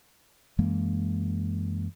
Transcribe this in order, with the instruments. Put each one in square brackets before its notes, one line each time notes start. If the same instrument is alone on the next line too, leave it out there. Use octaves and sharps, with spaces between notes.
[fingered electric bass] F#2 E3 G#3 A#3